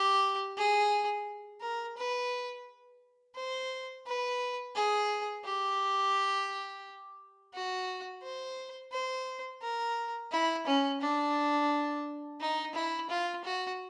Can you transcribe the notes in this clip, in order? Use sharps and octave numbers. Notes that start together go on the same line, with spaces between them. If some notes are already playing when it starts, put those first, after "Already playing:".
Already playing: G4
G#4
A#4
B4
C5
B4
G#4
G4
F#4
C5
C5
A#4
E4
C#4
D4
D#4
E4
F4
F#4